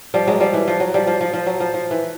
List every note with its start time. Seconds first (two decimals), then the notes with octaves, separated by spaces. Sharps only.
0.14 F3 G3
0.27 F#3 G#3
0.40 F3 G3
0.54 E3
0.68 F3
0.80 F#3
0.94 F3 G3
1.07 F3
1.21 F3
1.34 F3
1.46 F#3
1.60 F3
1.74 F3
1.91 E3